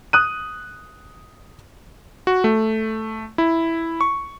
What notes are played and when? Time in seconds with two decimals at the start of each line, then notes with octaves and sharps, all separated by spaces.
0.13 D#6 F#6 D#7
2.27 F#4
2.44 A3
3.38 E4
4.01 C#6